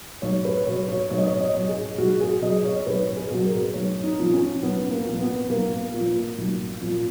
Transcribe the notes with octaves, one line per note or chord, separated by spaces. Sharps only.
B1 C#5
B4
B2 F#3 C#5
C#5
B1 C#5
D#5
C#5
D#5
B2 F#3
G#4
B1 F#4
G#4
B2 F#3 D#5
C#5
B1 B4
G#4
B2 F#3
A#4
B1 C#5
D#4
A#2 F3
C#4
B1 B3
A#3
A#2 F3
B3
B1 A#3
A#2 F3
B1
A#2 F3